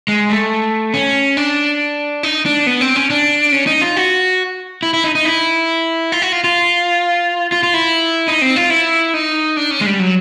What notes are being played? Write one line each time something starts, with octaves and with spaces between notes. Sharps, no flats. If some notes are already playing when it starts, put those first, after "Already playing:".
G#3
A3
C#4
D4
D#4
D4
B3
C4
C#4
D4
C#4
D#4
F4
F#4
E4
E4
D#4
D#4
E4
F4
F#4
F4
F4
F4
F4
E4
D#4
C4
F4
E4
D#4
D4
C#4
G#3
G3
F#3